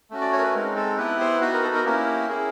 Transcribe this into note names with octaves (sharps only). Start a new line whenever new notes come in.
A3 C#4 F#4
D5
C#5
A#4
B4
G#3 C4 D#4 A#4
A4
B3 E4 G4 B4
C5
B3 D#4 F#4 B4
A#4
A4
A#4
A#3 C#4 E4 G4 A#4
C#4 E4 G#4